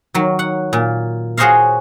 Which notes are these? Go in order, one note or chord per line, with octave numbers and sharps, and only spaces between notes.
D#3 F#3
F#5
A#2
F#4 G#4 C5 C#5 D#5 F5